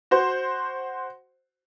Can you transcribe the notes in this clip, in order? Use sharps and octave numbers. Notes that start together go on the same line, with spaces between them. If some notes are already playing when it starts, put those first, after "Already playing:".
F#4 C5